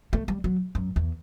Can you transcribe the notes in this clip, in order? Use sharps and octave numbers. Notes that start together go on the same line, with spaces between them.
A3
G3
F#3
F#2
E2